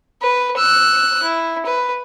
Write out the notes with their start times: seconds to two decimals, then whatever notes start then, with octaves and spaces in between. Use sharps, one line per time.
0.22 B4
0.57 E6 F#6
1.23 E4
1.66 B4